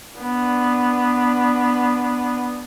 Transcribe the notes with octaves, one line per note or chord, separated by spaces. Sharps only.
B3 D4